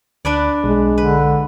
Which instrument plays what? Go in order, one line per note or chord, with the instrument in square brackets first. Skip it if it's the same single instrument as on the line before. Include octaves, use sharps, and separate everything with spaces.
[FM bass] D2 [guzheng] D4 B4 D5
[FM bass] B1 [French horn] G#3
[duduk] D3 [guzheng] B4